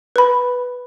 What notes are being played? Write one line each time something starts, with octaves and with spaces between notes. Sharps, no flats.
B4 B5